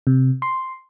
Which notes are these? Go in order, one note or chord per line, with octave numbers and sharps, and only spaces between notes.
C3
C6